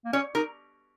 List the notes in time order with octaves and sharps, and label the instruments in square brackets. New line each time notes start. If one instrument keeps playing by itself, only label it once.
[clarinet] A#3
[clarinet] C#4 [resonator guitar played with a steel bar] C#5
[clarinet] D#4 [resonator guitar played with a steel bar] A#4